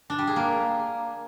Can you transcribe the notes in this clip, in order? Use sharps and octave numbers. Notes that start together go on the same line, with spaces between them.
D4
G3
G#4
A#3